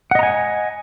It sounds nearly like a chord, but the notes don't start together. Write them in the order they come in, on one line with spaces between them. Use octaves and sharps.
F#5 D#5 A#5 G#5